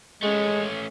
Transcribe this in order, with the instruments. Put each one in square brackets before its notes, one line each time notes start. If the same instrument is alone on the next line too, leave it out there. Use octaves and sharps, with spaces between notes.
[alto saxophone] G#3 [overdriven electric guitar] A3 C#4